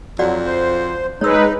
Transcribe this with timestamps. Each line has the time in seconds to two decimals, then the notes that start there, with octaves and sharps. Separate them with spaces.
0.19 F2 F#3 F#4 D5 F#5
0.46 C5
1.21 G#3 D#4 B4 C#5 E6